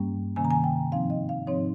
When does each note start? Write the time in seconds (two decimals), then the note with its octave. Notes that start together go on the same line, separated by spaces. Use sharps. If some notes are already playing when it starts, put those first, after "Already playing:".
Already playing: G2 G3 A#3 C#4
0.36 C3 D#3 A#3 C#4 G#5
0.45 A#5
0.51 G#5
0.64 G5
0.91 G#2 F3 C4 D#4 F5
1.10 D#5
1.29 F5
1.47 G#2 F3 C4 D#4 C#5